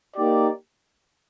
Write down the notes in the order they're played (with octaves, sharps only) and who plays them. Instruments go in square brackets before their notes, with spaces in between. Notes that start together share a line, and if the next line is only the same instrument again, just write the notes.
[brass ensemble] A#3 D#4 G4 D5